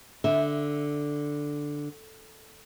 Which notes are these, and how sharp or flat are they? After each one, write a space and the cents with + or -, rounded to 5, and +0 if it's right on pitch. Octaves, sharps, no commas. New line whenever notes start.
D3 +0 E5 -10